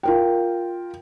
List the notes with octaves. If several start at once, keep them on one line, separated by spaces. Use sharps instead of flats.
F4 A#4 G5